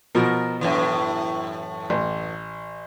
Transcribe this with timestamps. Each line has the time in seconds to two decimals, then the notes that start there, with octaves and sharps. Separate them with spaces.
0.15 B2 F3 F#4 A#4
0.61 F#2 A2 E3
1.90 A1